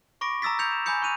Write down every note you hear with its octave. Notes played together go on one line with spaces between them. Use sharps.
B5 C#6 D6 A#6 D7
A#5 D#6 E6 A6 B6
G6 G#6 C#7 F7
E7
G#5 B5 D#6 G6 C#7
C#6 F#6 D#7 F7